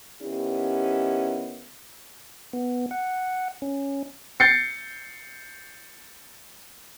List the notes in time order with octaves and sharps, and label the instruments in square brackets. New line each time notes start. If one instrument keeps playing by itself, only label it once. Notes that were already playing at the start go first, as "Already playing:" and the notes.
[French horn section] D#3 B3 C#4 E4 G4
[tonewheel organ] B3
F#5
C#4
[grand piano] G6 A6 C7 C#7